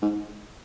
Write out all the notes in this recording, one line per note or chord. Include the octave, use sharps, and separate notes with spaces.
G#2